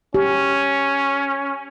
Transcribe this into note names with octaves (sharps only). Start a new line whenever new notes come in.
C#4 G4